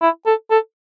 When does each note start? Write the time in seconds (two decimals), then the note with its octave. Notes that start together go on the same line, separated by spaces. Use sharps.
0.02 E4
0.27 A4
0.51 A4